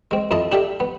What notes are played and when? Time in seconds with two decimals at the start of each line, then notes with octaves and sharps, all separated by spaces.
0.11 G#3 C4
0.31 F2 E4 D#5 A5
0.52 D4 G4 A4 E5
0.80 B3